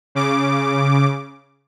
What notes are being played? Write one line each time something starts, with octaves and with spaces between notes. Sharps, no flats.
C#3 D6